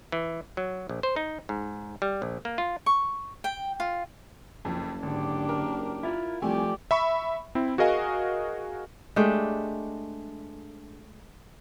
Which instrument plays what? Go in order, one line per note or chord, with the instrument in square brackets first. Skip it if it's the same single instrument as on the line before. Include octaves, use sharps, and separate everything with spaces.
[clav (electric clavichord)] E3
F#3
A#1
C5
D#4
G#2
G3
A#1
A#3
F4
[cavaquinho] C#6
G5
F4
[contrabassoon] F#1 [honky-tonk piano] F2 F3
[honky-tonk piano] G#1 [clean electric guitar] D3 [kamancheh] D4 G4
[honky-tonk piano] A#4
[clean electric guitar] E4 F4
[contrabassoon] C2 [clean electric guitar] F3 A3 [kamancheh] G4 D5 [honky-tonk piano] G#5
[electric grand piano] E5 B5 C#6
C4 E4
F#4 G#4 A#4 D#5 F5 G#5
[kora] G#3 A3 D4 G4